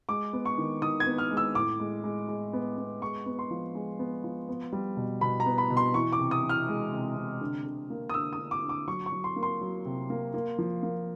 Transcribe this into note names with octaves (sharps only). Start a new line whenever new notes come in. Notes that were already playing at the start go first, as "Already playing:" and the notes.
G#3 D6
B3
C#6
D#3
D#3 D#6
G#6
B3
F6
G#3
E6
A2 D6
G#3
G#3
G#3
B3
B3
G#3 C#6
B3
C6
F3
G#3
B3
F3
B3
G3
B2
B2 B5
A#5
B3
B5
B2
C6
E3 C#6
D6
C3
D#6
E3
F6
G#3
C3
C3
D3
D3
A#3
D#6
D3 E6
D#6
D3
D6
D3
D6
F#3 C#6
C#6
F#3
C6
A#3
C6
F#3
C3
A#3
A#3
F3
A#3